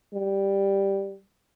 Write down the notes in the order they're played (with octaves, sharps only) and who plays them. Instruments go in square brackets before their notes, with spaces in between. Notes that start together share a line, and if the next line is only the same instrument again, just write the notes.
[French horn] G3